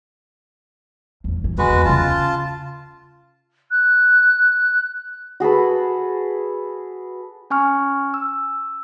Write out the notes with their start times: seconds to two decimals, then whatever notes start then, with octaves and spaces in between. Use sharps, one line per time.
1.24 E2 G#2
1.41 A#2 E3
1.58 C#2 G#3 F#4 B4
1.73 E2
1.85 C#3 C#4 F4 A5
3.70 F#6
5.40 F#4 G#4 A4 B4
7.50 C#4 G#5 C#6 F6
8.14 E6